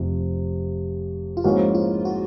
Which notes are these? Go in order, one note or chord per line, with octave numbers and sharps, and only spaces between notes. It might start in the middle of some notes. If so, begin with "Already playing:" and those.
Already playing: F1 F2 C3
F4
G#2 F3 A#3 C#4 E4 F#4
F4
F#4